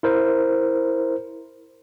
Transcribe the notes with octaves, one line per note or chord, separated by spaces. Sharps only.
E4 A#4 C5